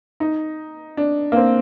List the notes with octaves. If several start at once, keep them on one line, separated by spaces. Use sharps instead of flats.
D#4
D4
A#3
C4